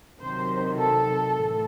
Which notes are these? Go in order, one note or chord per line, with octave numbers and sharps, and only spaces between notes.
C3 D#3 F#3 C5
A4
A2 E3